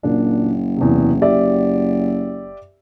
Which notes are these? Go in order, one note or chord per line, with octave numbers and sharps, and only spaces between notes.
F#1 A#2 D4
E2 C3
G4 D5 E5